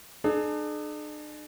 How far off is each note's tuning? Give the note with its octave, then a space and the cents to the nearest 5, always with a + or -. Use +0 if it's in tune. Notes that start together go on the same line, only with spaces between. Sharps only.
D4 +45 G#4 +40